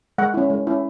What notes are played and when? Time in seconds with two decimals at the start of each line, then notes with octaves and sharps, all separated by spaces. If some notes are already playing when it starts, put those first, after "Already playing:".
0.18 G#3 F#5
0.34 C#4 E4
0.50 G#3
0.67 C#4 E4